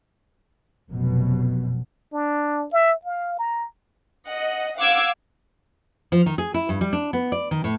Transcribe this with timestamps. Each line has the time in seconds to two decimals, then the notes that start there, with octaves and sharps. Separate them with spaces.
0.89 F1 F#2 B2
2.13 D4
2.73 E5
3.05 F5
3.39 A#5
4.28 D#5 F#5
4.77 F5 F#5 D6 E6 G#6
6.12 F3
6.26 D#3
6.38 G#4
6.54 E4
6.69 G2
6.81 G3
6.93 D4
7.13 B3
7.32 D5
7.51 D#3
7.64 A2